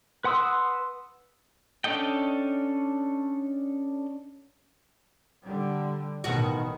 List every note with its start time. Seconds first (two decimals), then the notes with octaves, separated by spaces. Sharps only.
0.24 B4 F#5 C6 D#6 E6
1.84 C#4 D4 A4 D#5 G5
5.45 D3 G3
6.24 A1 B2 D#3 F#4